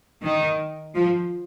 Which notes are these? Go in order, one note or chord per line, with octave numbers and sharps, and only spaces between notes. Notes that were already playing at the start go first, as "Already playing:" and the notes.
D#3
F3